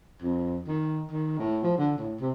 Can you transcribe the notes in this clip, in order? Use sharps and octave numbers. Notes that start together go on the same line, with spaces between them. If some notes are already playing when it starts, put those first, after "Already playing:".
F2
D#3
D#3
A2
F3
D3
A2
C3